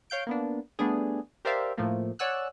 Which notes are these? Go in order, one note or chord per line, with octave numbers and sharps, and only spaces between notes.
C#5 F5 G6 D7
A#3 B3 D4
G3 A3 B3 D4 G#4
G4 A#4 C5 D5 E5 F5
A2 F3 A3 A#3
C#5 D5 F#5 G#5 E6 F#6